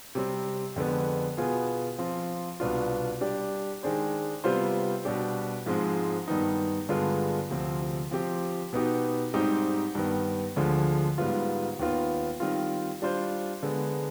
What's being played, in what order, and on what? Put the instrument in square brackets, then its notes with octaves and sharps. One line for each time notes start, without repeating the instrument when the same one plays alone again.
[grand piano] C3 G3 C4
F2 D3 G#3 B3
B2 B3 F4 G#4
F3 C4 F4
C2 B2 B3 D4 F4
G3 D4 G4 D5
D#3 G#3 D4 G#4 C5
C3 G3 B3 F4 C5
B2 G3 D4 G4
G#2 F3 G#3 C4
G2 D#3 B3 D#4
G2 D3 G#3 B3 F4
D2 C3 F3 C4
F3 C4 G4
B2 B3 D#4 G4
G#2 G3 C4 D#4 G4
G2 D#3 B3
D2 D3 F3 G#3
G#2 G3 B3 F4
D#2 D#3 B3 F4
D#3 G3 C4 F4
G3 D4 F4 C5
D3 G#3 B3